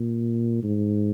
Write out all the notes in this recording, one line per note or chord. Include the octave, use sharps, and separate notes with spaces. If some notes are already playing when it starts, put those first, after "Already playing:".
Already playing: A#2
G#2